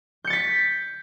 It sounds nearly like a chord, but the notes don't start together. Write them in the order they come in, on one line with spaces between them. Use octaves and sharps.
G6 C#7 A6 B6